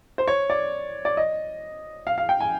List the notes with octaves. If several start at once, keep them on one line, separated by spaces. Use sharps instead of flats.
C5
C#5
D5
D5
D#5
F5
F5
G5
G#5